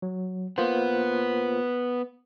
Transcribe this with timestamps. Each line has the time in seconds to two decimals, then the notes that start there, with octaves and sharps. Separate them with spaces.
0.02 F#3
0.58 A#3 B3 F4 C5